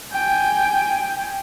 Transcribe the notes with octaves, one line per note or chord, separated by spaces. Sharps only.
G5 G#5